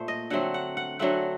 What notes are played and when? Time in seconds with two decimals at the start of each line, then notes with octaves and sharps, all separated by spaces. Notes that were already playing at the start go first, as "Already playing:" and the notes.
Already playing: A#2 A3 C5
0.08 D#5
0.30 D3 F#3 A3 C4 F#5
0.54 F#5
0.77 F#5
0.99 D3 F#3 A3 C4 F#5